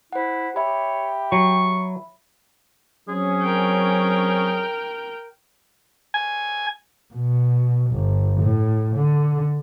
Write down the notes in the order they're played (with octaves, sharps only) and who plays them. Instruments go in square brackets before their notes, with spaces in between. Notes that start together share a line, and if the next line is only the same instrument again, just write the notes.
[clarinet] E4 [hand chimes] C5 F#5
[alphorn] G4 [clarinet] C#5 [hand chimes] E5 B5
[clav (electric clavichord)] F#3 [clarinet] C#6
[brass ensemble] F#3 C4 C#4 [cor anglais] G#4
[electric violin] A#4 G5
[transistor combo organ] G#5
[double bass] B2
G1
A2
D3